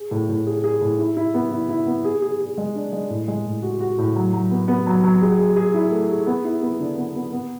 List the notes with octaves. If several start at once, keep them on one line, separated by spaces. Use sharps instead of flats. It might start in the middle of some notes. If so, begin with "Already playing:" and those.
Already playing: G#4
A2
A2
G#4
G#4
A2
E4
E4
B3
E4
E4
B3
G#4
G#4
G#4
G#3
D4
G#3
A2
G#3
A2
F#4
F#4
A2
F#3
F#3
B3
B3
F#3
F#3
G#4
G#4
G#4
E4
A3
G#4
B3
E4
B3
D3
B3
B3
B3